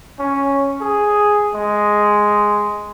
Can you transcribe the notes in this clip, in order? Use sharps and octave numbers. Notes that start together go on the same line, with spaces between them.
C#4
G#4
G#3